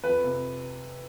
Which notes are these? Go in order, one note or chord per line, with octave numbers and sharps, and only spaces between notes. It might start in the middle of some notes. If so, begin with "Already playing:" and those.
F2 B4
C3